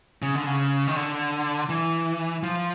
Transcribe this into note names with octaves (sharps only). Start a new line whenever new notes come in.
C#3
D3
C#3
D#3
D3
E3
F3